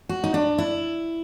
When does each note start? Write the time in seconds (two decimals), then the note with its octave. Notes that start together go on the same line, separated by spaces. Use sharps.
0.09 F#4
0.24 D#4
0.34 D4
0.58 E4